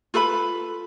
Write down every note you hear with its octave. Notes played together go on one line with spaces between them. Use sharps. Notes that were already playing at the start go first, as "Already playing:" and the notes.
F4 A4 B4 B5